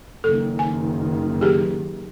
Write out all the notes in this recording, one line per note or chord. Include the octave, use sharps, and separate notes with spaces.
F#1 D#3 A4
G#5
G4 G#4